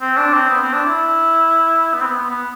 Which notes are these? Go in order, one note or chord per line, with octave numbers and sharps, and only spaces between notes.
C4
D4
C4
B3
C4
D4
E4
B3
C4
B3
B3
B3